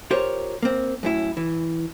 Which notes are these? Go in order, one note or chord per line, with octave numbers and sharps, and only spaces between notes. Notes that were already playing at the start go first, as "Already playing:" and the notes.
F4 G4 A#4 C5 C#5
A#3 C4
F#2 A2 E4
E3